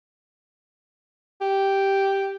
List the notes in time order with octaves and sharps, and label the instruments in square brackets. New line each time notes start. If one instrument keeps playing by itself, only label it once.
[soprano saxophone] G4